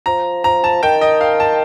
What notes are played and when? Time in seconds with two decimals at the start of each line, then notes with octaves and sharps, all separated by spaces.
0.06 F3 A#5
0.44 F3 A#5
0.64 A5
0.83 D#3 G5
1.01 D#5
1.21 F5
1.40 A5